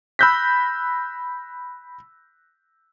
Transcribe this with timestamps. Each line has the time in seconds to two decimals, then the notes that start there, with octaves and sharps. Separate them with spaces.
0.19 B5 E6 F#6 G6 A#6 B6